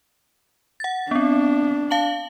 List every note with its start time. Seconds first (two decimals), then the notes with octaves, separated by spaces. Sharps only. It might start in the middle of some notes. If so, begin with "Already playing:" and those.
0.80 F#5 A6
1.11 B3 C4 D4
1.91 F5 A5 F#7